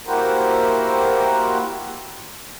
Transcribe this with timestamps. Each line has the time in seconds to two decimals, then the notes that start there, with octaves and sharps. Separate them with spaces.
0.07 A#3 E4 F#4 G4 A#4 C5